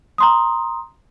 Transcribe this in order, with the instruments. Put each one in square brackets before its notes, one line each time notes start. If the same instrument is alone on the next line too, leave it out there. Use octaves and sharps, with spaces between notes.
[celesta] A#5 C6 D#6